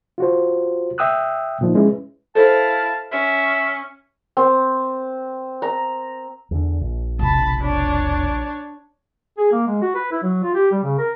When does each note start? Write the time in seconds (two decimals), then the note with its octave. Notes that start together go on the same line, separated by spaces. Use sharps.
0.18 F4 F#4 C5
0.98 E5 G5 D#6 E6 F#6
1.61 A#2 F3 D#4
1.75 G#3 C#4 E4 B4
2.35 E4 A4 C5 F5 A5
3.12 C#4 E5
4.37 C4
5.62 A#5
6.51 E2 D3
6.81 A#1
7.19 E1 C3 A5 B5
7.61 D4 C#5
9.38 G#4
9.52 A#3
9.67 G#3
9.82 F#4
9.95 B4
10.11 E4
10.23 F#3
10.43 F4
10.55 G4
10.72 G3
10.83 C#3
10.98 A#4